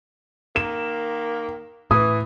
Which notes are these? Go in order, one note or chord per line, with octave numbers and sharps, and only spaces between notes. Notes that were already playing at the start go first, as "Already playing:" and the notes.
D#3 A#3 E7
A2 E3 D#6